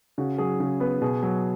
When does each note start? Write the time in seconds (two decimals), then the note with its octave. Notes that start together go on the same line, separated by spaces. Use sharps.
0.18 C#3 F#4
0.38 F#3 G#4
0.60 C#3
0.80 B3 B4
1.01 B2 G#4
1.23 F#3